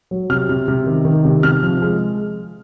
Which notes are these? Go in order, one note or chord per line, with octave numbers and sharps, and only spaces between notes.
F#3
C3 F6
C3
C3
D#3
D#3
C3
C3 F6
F3
G#3